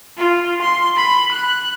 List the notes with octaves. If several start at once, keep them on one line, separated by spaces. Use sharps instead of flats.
F4
C6
B5
F#6